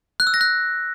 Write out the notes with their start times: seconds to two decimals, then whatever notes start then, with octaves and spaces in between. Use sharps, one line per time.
0.20 F#6
0.27 E6
0.34 A#6
0.41 F#6